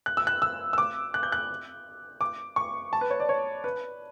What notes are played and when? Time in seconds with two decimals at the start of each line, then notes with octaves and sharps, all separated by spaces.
0.06 F#6
0.17 E6
0.27 F#6
0.42 E6
0.73 E6
0.78 D6
1.14 F#6
1.23 G6
1.32 F#6
2.21 D6
2.56 C#6
2.93 A5
3.01 B4
3.10 C#5
3.20 D5
3.29 C#5
3.64 B4